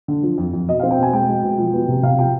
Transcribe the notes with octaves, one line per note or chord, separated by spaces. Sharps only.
D3
F3
F2
F2
B2 D#5
C4 F5
G5
B2 G#5
G#3 G5
G#3
B2
F3
B3
C3
C3 F5
F3 G5